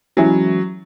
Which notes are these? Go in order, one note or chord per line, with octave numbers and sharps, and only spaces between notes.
E3 F#3 G#3 C#4 E4